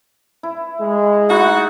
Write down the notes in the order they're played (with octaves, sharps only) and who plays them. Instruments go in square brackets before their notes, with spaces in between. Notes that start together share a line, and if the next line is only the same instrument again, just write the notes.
[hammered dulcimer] E4
[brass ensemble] G#3
[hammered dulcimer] A3 D#4 E4 [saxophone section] F#4 [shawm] F#5